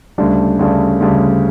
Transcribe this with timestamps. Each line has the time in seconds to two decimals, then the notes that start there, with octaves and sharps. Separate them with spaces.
0.18 D2 C#3 G3 D4
0.59 D2 C#3 G3 D4
1.01 D2 C#3 G3 D4